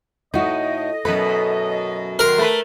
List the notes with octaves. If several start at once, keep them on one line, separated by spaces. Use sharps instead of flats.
A2 D#4 F#4 D#5
F#2 B2 A4 B4
D#3 A#4 F#5 C6
A3 B4